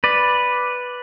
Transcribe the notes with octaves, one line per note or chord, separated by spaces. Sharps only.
B4 D5